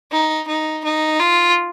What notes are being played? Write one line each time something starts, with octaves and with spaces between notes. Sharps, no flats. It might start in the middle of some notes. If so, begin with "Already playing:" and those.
D#4
D#4
D#4
F4